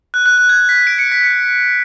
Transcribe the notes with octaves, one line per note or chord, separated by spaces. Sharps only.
F#6
F#6
F#6
G#6
B6
D7
C#7
B6
C#7